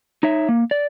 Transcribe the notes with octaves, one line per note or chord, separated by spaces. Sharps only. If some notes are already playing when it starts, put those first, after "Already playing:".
D#4 C#5 E5
A#3
D5